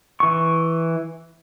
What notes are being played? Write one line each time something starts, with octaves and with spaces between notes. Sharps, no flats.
E3 C#6